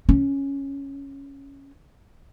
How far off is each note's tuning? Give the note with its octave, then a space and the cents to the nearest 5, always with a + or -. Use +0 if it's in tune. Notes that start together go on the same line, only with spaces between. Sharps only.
C#4 +0